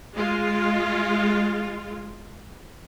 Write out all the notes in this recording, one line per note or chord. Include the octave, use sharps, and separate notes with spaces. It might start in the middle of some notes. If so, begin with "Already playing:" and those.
G#3 F4